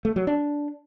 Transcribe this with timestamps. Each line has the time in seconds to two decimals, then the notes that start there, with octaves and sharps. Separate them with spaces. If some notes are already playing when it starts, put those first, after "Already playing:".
0.05 A3
0.16 F#3
0.27 D4